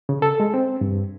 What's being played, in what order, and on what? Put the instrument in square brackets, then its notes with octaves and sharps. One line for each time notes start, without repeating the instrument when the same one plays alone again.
[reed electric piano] C#3
A4
G#3
C4
G2